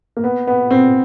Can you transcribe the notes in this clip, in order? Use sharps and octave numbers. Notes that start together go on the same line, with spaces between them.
A#3
B3
B3
C4